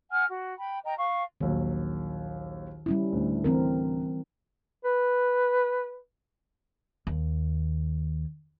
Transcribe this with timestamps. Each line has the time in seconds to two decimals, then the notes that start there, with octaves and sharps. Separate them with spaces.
0.11 F#5 G#5 F6
0.29 F#4
0.57 G5 B5
0.85 D#5 G5 A#5
0.98 F5 C#6
1.41 A#1 D#2 D#3 F#3
2.86 G3 C#4 E4
3.12 D2 A2 D3
3.44 E3 C4 A#4
4.84 B4
7.07 D#2